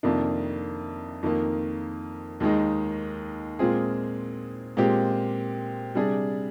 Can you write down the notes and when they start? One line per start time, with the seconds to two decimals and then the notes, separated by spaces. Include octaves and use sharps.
0.03 F2 C3 D#3 A#3 D4
1.23 F2 D#3 A#3
2.40 D#2 D#3 G#3 D#4
3.59 A#2 G#3 C4 F4 G#4
4.77 A#2 G#3 C4 G4
5.95 C3 G3 D4 G#4